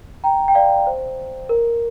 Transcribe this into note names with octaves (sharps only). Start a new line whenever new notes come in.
G5 A#5
G5
D5 F5
C5
A#4